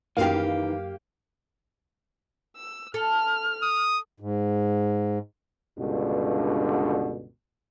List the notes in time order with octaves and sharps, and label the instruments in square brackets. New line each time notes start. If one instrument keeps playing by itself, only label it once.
[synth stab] F#2 F5 [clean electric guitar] D#3 E3 [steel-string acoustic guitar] A#3 G4
[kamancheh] E6
[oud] A4 [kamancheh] F6
[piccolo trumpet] D#6
[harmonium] G#2
[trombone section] C#2 G2 B2 D3